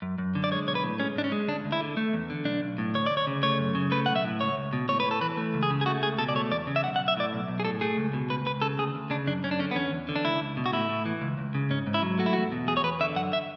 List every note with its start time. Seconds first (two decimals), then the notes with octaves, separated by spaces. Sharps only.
0.02 F#2
0.18 F#2
0.35 D3
0.44 D5
0.51 G#3 C#5
0.67 B1 C#5
0.75 B4
0.84 A2
1.00 G#3 C#4
1.16 G#2 D4
1.24 C#4
1.32 G#3
1.48 D2 D4
1.65 D2
1.72 E4
1.81 D3
1.97 A3
2.13 E2
2.30 D3
2.45 B1 D4
2.62 B1
2.78 A2
2.95 D2 C#5
3.06 D2 D5
3.17 C#5
3.27 C#3
3.43 A3 C#5
3.59 F#2
3.75 C#3
3.91 A3 B4
4.06 B1 F#5
4.16 E5
4.25 A2
4.40 C#2 C#5
4.57 C#2
4.73 B2
4.88 A2 C#5
5.00 B4
5.05 A2
5.11 A4
5.21 E3 B4
5.37 A3
5.54 C#2
5.63 G#4
5.70 C#3
5.81 G#4
5.86 A3 F#4
6.02 C#2 G#4
6.19 B2 A4
6.29 D5
6.35 A3 C#5
6.51 E2 D5
6.67 C#3
6.76 E5
6.83 B1 F#5
6.96 F#5
6.99 B1
7.08 E5
7.17 A2 D5
7.33 B1
7.48 B1
7.60 G#4
7.65 A2 A4
7.81 A3 G#4
7.97 C#2
8.13 B2
8.30 C#2 B4
8.46 C#2 B4
8.62 C#3 A4
8.78 D2 G#4
8.95 D2
9.10 C#3 D4
9.27 F#2 D4
9.44 F#2 C#4
9.51 D4
9.59 D3 C#4
9.71 B3
9.76 E2 C#4
9.92 E2
10.09 D3
10.16 D4
10.24 C#2 E4
10.40 C#2
10.57 B2
10.66 F#4
10.73 A2 E4
10.89 A2
11.06 E3
11.21 C#2
11.38 C#2
11.55 C#3
11.70 G#2 C#4
11.87 G#2
11.94 E4
12.02 F#3
12.19 A3 F#4
12.26 E4
12.33 E2 F#4
12.52 B2
12.68 E2 G#4
12.77 C#5
12.84 E2 B4
13.00 D3 E5
13.16 F#2 F#5
13.33 E5